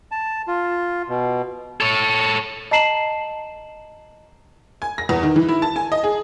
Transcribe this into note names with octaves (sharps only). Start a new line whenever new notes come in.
A5
F4
B2
A4 C#5
D#5 A5 A#5 C7 E7 F#7
G#5
A#6
E2
D#3
E3
E4
A5
G#5
D#5
G#4